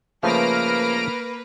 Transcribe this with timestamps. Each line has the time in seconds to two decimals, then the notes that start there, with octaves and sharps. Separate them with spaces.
0.23 C#3 F3 A3 A#3 B4 F6 A#6 D7